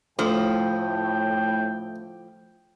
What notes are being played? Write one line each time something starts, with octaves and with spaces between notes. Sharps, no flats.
D2 A2 F3 G5